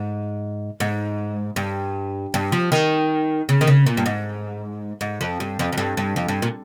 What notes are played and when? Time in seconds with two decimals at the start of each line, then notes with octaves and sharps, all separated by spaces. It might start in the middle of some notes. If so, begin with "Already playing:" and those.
Already playing: G#2
0.80 G#2
1.56 G2
2.34 G2
2.52 F3
2.72 D#3
3.49 C#3
3.61 D#3
3.67 C#3
3.87 A#2
3.97 G2
4.06 G#2
5.01 G#2
5.21 F2
5.40 G2
5.59 F2
5.72 F2
5.77 G2
5.97 G2
6.16 F2
6.28 G2
6.42 A#2